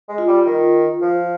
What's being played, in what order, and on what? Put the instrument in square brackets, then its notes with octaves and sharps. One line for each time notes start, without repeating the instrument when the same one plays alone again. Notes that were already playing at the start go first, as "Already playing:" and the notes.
[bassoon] G#3
[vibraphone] F4
[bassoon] G3
D#3
F3